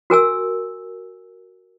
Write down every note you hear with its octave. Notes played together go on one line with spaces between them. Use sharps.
F#4 A#4 G#5 E6